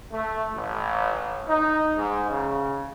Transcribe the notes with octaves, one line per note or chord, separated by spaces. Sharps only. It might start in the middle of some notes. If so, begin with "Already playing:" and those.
A3
A1
D#4
G#2
C#3